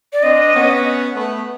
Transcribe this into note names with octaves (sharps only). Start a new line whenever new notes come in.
D5
C4 D4 D#5
B3 C#4
A3 B3